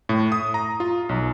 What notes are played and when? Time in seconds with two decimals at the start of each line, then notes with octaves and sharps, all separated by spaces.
0.09 A2
0.32 D#6
0.54 A#5
0.80 F4
1.09 B1